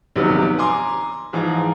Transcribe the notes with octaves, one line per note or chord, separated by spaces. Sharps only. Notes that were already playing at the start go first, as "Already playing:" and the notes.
A#1 C3 D#3 F#3 B3
G#5 A#5 C6 D6
G#2 E3 F3 A#5